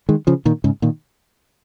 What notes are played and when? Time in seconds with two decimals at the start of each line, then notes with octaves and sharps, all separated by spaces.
0.09 D#3 G#3
0.27 C#3 F3
0.45 A#2 D#3
0.64 G#2 C#3
0.82 A#2 D#3